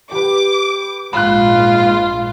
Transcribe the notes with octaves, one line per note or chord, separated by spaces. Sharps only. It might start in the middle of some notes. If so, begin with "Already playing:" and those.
G4 B4 D6
A#1 G#2 F4 B5 F#6